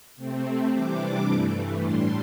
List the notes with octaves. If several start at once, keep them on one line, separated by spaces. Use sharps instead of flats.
C3 A3 C4
C3 E3 G3 D4 D6
G2 E3 A3
A2 G3 D4 C6